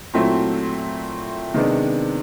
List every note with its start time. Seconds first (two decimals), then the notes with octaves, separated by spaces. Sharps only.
0.13 A#2 F#3 A3 C4 E4
1.54 C3 D#3 G#3 B3 D4